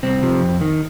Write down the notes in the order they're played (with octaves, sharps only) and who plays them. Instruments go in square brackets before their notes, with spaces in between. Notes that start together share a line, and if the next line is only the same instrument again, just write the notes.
[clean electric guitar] C2 C4
C3 F3
F2
D#3